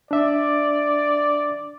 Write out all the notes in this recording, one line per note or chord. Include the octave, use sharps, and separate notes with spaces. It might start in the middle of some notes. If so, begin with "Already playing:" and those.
D4 D5 E5